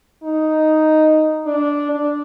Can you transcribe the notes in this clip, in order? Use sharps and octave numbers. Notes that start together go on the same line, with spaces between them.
D#4
D4
D4